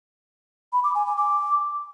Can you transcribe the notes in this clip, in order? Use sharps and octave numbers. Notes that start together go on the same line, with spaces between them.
B5
D6
G#5
G#5
D6